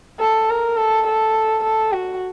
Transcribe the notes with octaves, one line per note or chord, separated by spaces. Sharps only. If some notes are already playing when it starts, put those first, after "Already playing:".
A4
A#4
A4
A4
A4
F#4